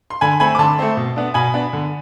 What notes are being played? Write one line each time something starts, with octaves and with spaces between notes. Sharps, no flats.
C6
D3 G#5 B5
A3 C4 G#5 B5
D6
D3 A5 C6
A3 C4
B2
B3 D4
B2 G#5 B5
B3 D4
D3